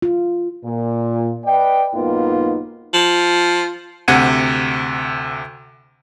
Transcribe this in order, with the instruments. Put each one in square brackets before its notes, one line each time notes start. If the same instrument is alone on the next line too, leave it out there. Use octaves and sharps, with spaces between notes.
[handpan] F4
[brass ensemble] A#2
B4 D5 D#5 G5
B1 G#2 A#3 B3 D#4 F4
[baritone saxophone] F3
[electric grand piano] D2 C3 F#5 G#6 D#7